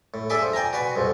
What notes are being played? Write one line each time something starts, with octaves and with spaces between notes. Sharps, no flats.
A2
D4 G#4 A4 E5 G#5 D6
F3
D5 G5 G#5 A#5
F#4 B4 D5 G#5
C2 F2 F3